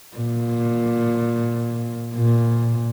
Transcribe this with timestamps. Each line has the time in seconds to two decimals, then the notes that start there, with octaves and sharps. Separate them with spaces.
0.17 A#2
2.16 A#2